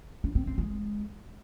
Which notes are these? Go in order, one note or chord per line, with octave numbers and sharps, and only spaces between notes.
D4
C4
C4
G#3